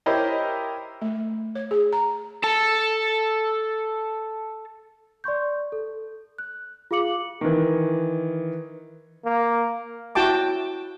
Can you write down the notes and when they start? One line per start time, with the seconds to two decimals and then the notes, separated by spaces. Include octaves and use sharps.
0.06 E4 G4 A#4 C5 C#5 D#5
1.02 A3
1.55 C#5
1.71 G#4
1.93 A#5
2.44 A4 A5
5.24 D5 C6 C#6 G6
5.72 A4
6.38 F#6
6.91 F4 G#4 F5 D6 C#7 F#7
7.41 D#3 E3
9.25 A#3
10.15 E4 F#4 G5 A5 D6